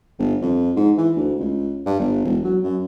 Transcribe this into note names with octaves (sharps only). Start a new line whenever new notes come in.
G1
F2
G#2
E3
D2
C#2
G2
G1
E1
F#3
F#2